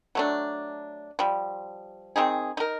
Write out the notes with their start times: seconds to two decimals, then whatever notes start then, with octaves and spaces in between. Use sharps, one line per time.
0.15 F#3 A3 D4
1.19 F3 G3
2.16 D#3 C4 D#4 G#4
2.57 D#4 A#4